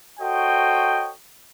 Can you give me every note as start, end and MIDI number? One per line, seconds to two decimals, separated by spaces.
0.19 1.11 66
0.19 1.11 69
0.19 1.11 72
0.19 1.11 73
0.19 1.11 75
0.19 1.11 79